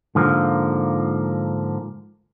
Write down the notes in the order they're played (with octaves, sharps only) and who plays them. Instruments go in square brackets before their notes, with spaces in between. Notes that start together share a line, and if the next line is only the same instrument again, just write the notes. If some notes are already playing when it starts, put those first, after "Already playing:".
[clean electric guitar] G#2 D3 F3 A#3